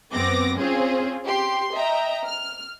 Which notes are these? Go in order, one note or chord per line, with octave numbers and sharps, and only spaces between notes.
F#2 B3 C4 D6 A#6
C4 C#4 F4 G#4 C5
G4 C6
D#5 E5 G5 A#5
F6